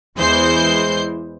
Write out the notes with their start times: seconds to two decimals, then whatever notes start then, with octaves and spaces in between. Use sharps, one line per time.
0.17 E2 E3 G#3 C5 G6 C7